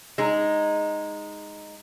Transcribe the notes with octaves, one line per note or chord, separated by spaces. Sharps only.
G#3 D#4